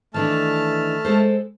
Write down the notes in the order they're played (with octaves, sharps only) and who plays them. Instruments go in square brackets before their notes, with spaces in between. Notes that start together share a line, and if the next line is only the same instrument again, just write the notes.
[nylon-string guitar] D#3 E3 D4 [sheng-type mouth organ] A3 A5 F6
[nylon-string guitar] G#3 A4 C5